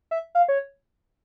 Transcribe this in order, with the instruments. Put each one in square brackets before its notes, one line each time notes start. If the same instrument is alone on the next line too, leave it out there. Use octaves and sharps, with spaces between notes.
[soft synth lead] E5
F5
C#5